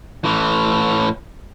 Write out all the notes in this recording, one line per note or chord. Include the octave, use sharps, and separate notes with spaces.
A2 E3